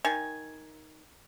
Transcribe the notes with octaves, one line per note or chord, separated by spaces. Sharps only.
D#3 G#5